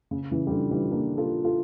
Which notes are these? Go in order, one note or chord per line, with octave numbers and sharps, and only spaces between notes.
C#3
C#3 E3
G3
D3 F3
E3 G3
A#3 D4
F4 A4
F4 A4